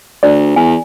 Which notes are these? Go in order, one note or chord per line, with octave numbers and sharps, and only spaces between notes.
D2 D5
E2 G#5